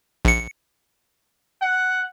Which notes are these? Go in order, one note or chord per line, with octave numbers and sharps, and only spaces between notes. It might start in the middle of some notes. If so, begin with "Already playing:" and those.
A#1 C#7
F#5